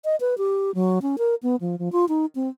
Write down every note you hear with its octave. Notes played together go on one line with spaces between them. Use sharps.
D#5
B4
G4
F#3
C#4
A#4
B3
F3
F3
F4
D#4
C4